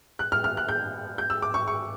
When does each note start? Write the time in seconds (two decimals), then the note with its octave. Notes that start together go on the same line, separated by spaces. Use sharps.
0.19 F#6
0.32 F6
0.44 F6
0.57 F#6
0.69 G6
1.18 G6
1.30 E6
1.42 D6
1.54 C#6
1.68 C#6